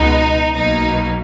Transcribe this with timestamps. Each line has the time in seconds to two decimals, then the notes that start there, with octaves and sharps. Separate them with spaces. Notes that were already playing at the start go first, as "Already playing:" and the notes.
Already playing: C#2 B2 G#3 B3 D#4
0.54 B1 B2 F#3 A#3 D#4